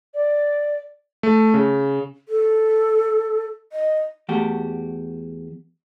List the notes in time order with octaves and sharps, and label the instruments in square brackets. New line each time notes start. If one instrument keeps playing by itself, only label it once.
[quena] D5
[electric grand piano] A3
C#3
[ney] A4
D#5
[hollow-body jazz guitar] E2 A3 F#4 G4